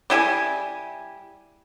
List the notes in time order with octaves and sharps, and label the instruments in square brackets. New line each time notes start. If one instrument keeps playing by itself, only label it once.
[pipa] G3 E4 G#5